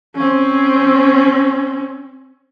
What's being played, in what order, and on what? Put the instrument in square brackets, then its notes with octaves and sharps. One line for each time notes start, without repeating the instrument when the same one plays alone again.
[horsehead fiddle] C4 C#4